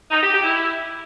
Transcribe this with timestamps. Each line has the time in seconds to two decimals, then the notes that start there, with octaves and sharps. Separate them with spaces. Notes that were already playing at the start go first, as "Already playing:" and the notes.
0.11 D#4
0.22 G4
0.33 G4
0.44 E4